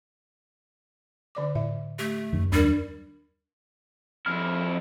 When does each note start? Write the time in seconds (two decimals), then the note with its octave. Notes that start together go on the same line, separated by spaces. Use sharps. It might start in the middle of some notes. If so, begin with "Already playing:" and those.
1.35 D3 D5 D6
1.55 A2 E5
1.99 A3 G4
2.33 F#2 D#3
2.52 D#2 G3 D4 A#4
4.26 F2 E4 F6